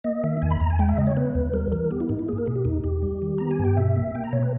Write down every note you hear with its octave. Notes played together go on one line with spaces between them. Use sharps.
A#3 D#5
D#3 E5
E2 G#5
B5
E2 A#5
G#5
G#3 G5
E5
C#3 D#5
C#5
B3 B4
D#2
G3 A#4
E3 A#4
B3 G4
E4
G#2 D#4
E4
A#3 G#4
A#4
B2 G#4
G4
E2 D#4
E2 G4
G3
D#3
B3 A#5
G#5
G2
G5
B2 E5
A#3
A#3 G5
A#5
B2 C#5
B4